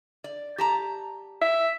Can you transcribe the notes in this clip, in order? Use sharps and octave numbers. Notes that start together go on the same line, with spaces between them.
D5
G4 A5 A#5
E5